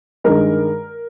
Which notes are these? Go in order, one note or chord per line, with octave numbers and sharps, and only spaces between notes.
G2 D#3 G#3 A#4